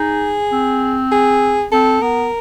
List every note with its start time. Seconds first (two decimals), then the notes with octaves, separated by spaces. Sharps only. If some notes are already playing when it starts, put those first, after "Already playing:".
Already playing: D#4 G#4
0.52 C4
1.12 G#4
1.72 C4 A4
2.02 B3 A#4